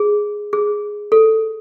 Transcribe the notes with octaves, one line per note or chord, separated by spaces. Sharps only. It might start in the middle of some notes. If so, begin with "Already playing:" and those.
Already playing: G#4
G#4
A4